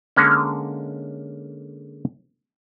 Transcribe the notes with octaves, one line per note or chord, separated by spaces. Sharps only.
D3 G#3 A#3 C#4